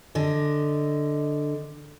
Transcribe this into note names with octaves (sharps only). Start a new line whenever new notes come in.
D3 D#5